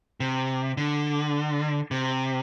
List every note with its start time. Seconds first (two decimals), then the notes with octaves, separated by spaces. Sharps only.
0.20 C3
0.77 D3
1.91 C3